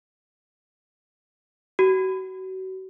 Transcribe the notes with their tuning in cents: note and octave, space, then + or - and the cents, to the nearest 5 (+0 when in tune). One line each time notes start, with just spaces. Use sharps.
F#4 +30